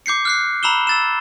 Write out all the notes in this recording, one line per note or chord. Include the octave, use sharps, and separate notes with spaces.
D6 G6 C7 C#7
F6 F#6 C7
A#5 B5 E6 E7 G7
E6 A6 E7